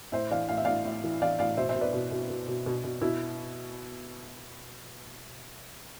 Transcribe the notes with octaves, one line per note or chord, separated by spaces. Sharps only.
A2 C5 E5
E3 D5 F5
A2 F5
E5
A2 D5 F5
A2
E3
E3 D5 F5
A2 D5 F5
B2 C5 E5
C5 E5
B2
B4 D5
B2
B2
B2
B2
B2
B2
B2 E4